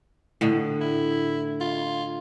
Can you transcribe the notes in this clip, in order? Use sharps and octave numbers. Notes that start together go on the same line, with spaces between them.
A2 D3 D#5
E4
F4